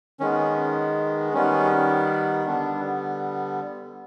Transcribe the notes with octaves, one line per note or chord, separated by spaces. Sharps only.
D#3 G#3 B3 C#4
D#3 G3 B3 C#4
D3 G3 B3 D4